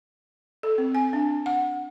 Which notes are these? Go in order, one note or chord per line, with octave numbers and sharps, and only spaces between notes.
A4
C4
G#5
D4
F#5